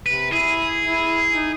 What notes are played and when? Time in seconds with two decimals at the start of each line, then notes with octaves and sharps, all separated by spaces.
0.06 C3 B4
0.32 E4 G#4
0.84 E4
1.33 D#4